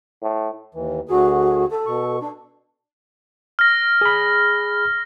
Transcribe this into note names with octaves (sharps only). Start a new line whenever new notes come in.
A2
D#2 E3
D2 D3 F#4 G#4
A4
B2 C#6
D4
F6 A#6
G#4 B5